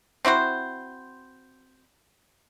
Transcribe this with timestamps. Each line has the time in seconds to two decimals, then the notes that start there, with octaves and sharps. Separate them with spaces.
0.25 C4 E4 F#4 C5